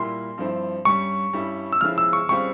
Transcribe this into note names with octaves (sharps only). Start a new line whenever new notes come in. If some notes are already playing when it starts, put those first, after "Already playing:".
Already playing: A#2 G3 A#3 E4 C6
G2 F3 C4 E4
G2 G3 C#4 C#6
G2 G3 C#4 E4
E6
C#3 F3 G#3 C#4 E4 F6
E6
C#6
C#3 G3 C4 F4 C#6